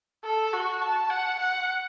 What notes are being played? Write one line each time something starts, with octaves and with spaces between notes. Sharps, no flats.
A4
F#4
A5
F#5
F#5